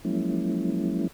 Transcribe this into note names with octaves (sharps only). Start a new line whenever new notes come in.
F3 F#3 G#3 A#3 C#4 E4